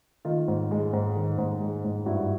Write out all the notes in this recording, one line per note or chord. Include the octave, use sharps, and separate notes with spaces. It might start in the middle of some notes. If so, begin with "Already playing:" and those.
D#3 D#4 F4
G#2
G#3
G#2
D#3
G#2
G#3
G#2
G2 E4 F#4